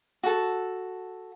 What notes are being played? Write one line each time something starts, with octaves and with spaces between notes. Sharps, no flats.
F#4 A4